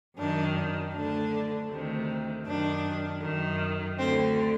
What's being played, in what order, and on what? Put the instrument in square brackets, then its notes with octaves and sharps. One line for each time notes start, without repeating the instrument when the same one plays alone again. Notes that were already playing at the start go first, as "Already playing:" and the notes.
[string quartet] F#2 D#3 D4
D2 D3 D4
D2 C3 D#3
F#2 D#3 D4
F#2 D#3
D2 D3 C4